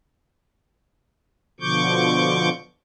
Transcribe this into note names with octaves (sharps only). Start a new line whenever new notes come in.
B2 D3 F3 C#6 D6 G6